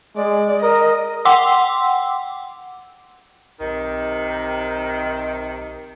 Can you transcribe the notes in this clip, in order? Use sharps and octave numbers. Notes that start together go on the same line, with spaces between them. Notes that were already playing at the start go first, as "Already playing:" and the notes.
G#3 D5
A#4 D#5
F#5 G5 C6 D6 E6
B1 C3 D#3